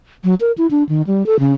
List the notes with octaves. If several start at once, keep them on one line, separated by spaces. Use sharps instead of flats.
F#3
A#4
E4
D4
D#3
G3
A4
C#3